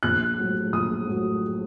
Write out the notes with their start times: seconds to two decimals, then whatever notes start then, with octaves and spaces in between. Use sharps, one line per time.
0.03 A#1 F#6
0.38 A2 F#3
0.72 A#1 D#6
1.07 A2 F#3